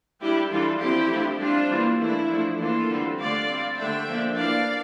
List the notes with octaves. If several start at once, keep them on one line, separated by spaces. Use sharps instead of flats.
G3 D4 E4 G4
E3 G3 D4 F4 A4
F3 C4 E4 G4
F3 A3 D4
G3 C4 D4 F4
E3 G3 A#3
E3 A3 D4 E4
F3 A3 D4
E3 A#3 D4 F4 A4
D3 G3 C4
D3 A3 D4 D5 F5
G3 C4
D3 A3 D4 E5 G5
F3 A#3 D4
E3 A#3 D4 D5 F5